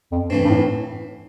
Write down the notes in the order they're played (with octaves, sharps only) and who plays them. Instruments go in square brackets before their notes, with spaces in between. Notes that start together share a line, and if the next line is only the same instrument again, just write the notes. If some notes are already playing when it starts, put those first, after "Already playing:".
[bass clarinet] F2
[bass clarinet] G2 [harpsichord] E3 A3 C4
[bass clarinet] G2
A2